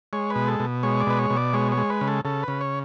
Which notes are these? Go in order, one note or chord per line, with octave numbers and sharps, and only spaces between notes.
G#3 C#5
B4
B2
A4
B2
G#3 C#5
D5
B2 B4
C#5
B2
D5
G#3 C#5
C#5
G#3
B4
C#3
A4
C#3 A4
B4
C#3
C#5